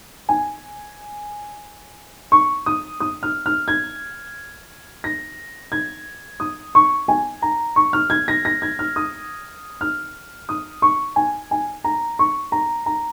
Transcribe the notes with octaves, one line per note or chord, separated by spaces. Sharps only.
G#5
C#6
D#6
D#6
F6
F6
G#6
A#6
G#6
D#6
C#6
G#5
A#5
C#6
F6
G#6
A#6
A#6
G#6
F6
D#6
F6
D#6
C#6
G#5
G#5
A#5
C#6
A#5
A#5